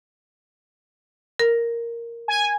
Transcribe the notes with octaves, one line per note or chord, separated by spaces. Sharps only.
A#4
G#5